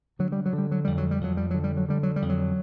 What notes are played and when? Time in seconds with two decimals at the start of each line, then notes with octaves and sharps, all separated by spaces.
0.19 D3 F#3
0.32 G3
0.46 F#3
0.53 D3
0.58 G3
0.71 F#3
0.85 F2 G3
0.98 F#3
1.11 G3
1.21 F2 F#3
1.37 G3
1.51 D3 F#3
1.64 G3
1.77 F#3
1.89 D3 G3
2.03 F#3
2.16 G3
2.22 F2
2.29 F#3